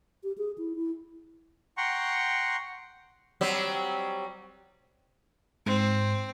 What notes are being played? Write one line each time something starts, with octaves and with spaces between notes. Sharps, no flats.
G4
G#4
E4
E4
F#5 G5 A#5 C6 C#6
F#3 G3 C4
G#2 C4